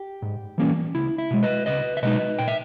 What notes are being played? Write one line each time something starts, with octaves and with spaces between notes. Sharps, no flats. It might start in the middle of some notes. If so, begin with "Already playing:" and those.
Already playing: G4
G#2
E3 G3 A#3 C#4
C#2 E4
E4
B2 G#3
B4 D#5
C#2 B4 D#5
E5
B2 G#3 D#4 B4 D#5
A#2 G5
E5